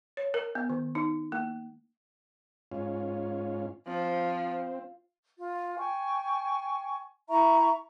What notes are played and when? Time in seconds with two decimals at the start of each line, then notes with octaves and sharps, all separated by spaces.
0.17 C#5
0.34 A#4
0.55 B3
0.70 D#3
0.95 D#4
1.32 A#3
2.72 G#2 C#4 F4
3.87 F3 C4
5.40 F4
5.78 G5 G#5 C#6
7.28 E4 E5 A#5 C#6